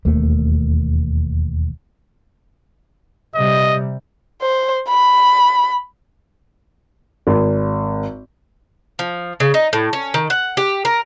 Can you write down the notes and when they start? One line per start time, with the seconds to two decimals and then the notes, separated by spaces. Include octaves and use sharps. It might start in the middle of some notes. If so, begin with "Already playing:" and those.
0.05 E1 D#2 A3 A#3
3.35 C3 G3 D#5
4.42 C5
4.88 B5
7.27 G#1
8.99 F3
9.40 C#3
9.54 D#4
9.73 A2
9.93 C#4
10.14 D#3
10.30 F#5
10.57 G4
10.85 A#4